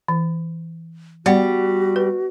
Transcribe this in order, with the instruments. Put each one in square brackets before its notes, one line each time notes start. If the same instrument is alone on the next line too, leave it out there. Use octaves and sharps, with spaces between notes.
[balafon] E3
[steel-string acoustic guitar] G3 [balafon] B3 D5 F#5 [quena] F#4
[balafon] B4